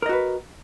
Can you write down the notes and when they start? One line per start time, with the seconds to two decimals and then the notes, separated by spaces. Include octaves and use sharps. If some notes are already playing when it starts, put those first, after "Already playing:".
0.02 A#4
0.06 D#5
0.09 F#4
0.13 B4